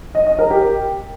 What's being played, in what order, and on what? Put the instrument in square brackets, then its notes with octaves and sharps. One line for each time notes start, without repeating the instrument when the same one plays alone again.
[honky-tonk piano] D#5
D#5
A#4
G4